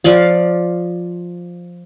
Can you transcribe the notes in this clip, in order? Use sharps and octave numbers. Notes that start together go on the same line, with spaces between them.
F3 D5 F5